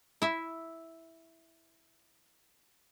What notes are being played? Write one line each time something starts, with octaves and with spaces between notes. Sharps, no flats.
E4 E5